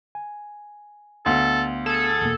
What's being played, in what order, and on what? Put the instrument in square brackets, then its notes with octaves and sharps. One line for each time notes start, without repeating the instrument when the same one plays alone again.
[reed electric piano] G#5
[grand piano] D2 [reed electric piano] B3 F5 C6 [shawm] A4
[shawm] G#4 [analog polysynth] A4
[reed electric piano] E2 B2 A#3